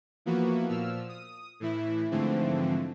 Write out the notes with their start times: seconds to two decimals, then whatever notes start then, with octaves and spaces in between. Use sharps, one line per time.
0.26 E3 F3 A#3 B3 F#4
0.69 A#2 F3 E6 F6
1.09 D#6
1.60 A2 E3 E4
2.11 G#2 D3 E3 F3 A3 C4